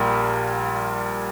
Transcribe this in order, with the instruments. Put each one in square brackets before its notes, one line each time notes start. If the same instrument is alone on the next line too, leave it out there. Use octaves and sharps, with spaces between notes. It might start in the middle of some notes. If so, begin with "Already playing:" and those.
Already playing: [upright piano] A#1 A#2 G3 A#4